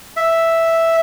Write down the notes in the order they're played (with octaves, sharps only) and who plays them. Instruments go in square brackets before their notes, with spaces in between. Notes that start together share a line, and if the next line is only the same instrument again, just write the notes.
[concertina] E5